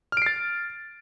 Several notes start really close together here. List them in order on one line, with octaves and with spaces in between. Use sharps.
F6 D7 C7 A6